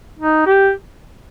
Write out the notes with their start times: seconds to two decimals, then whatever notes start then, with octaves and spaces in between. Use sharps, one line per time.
0.19 D#4
0.46 G4